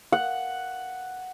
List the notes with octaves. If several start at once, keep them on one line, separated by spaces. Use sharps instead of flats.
F#5